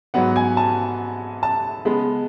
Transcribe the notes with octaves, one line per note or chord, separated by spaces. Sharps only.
G#2 F#3 B3 F#5
G#5
A5
A5
C#3 G#3 B3